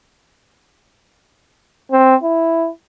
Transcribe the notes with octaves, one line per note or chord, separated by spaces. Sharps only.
C4
E4